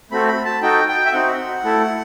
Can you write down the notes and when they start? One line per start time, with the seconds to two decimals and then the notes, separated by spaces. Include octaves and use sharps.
0.11 A3 C4 F#4 A4 B5
0.28 B5
0.45 A5
0.62 D#4 F#4 A4 G5
0.89 G5
1.06 E5
1.13 C4 D#4 F#4 F#5
1.64 A3 E4 A4